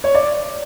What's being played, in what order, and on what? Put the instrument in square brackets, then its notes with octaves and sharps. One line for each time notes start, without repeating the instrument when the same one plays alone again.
[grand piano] C#5
D5